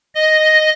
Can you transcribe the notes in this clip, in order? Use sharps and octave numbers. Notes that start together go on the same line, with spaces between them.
D#5